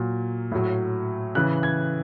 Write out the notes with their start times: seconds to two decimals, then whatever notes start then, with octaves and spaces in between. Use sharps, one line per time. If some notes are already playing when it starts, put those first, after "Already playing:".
Already playing: A#2 F#3
0.52 A2 F#3
1.35 C#3 E3 F#6
1.63 G#6